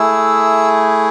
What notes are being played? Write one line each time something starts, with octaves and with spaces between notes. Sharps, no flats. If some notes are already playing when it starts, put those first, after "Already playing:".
Already playing: A3 E4 G#4 E6